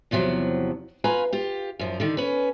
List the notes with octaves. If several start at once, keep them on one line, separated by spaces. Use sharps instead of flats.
E2 C3 F3 F#3
F4 B4 G#5 A#5
F4 G4
F#2 F3
D3 D#3
C#4 B4